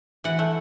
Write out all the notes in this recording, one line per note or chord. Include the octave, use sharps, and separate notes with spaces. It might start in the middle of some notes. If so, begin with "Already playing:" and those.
E3 F#5
A3